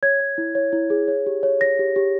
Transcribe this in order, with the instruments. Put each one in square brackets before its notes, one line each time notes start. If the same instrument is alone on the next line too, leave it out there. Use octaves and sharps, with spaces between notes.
[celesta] C#5 G#6
C#5
E4
C#5
E4
G#4
C#5
G4
C#5
C#5 A#6
G4
G4